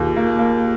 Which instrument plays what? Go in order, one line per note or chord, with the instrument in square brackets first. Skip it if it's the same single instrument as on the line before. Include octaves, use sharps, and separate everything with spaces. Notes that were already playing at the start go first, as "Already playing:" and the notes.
Already playing: [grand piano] D#2 [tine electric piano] F4 G#4
[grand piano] A#3
A#3